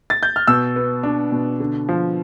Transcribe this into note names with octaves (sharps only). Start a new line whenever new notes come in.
A6
G6
F6
B2 E6
B3
D4
B2
D3
F3